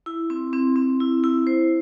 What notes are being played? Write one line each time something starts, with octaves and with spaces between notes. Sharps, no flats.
E4
C4
C4
C4
E4
E4
C5